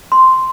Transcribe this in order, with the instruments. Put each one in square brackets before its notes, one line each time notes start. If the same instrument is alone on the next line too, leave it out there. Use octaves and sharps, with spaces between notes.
[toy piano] C6